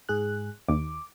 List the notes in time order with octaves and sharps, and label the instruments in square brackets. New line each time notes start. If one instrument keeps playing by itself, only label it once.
[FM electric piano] G#2 G#4 F#6
[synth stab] D#2 [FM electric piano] D6